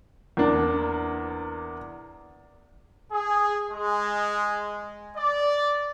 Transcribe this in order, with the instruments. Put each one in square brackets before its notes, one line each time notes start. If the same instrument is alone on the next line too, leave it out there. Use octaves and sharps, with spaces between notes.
[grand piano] E2 A#3 D4
[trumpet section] G#4
G#3
D5